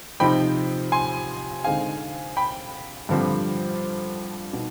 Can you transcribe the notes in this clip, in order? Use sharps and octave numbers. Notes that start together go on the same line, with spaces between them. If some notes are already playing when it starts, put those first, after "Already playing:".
C3 F3 C4 D#4 G5 B5
G#5 C6
D3 G#3 C4 D#4 F5 G#5
G5 B5
G2 D3 F3 C4
B2 B3 D#4